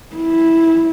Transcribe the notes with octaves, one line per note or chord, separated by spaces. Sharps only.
E4